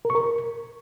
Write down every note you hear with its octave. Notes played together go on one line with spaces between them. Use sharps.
A#4
C#6
A#4